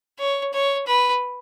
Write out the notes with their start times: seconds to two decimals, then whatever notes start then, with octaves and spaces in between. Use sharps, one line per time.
0.19 C#5
0.53 C#5
0.87 B4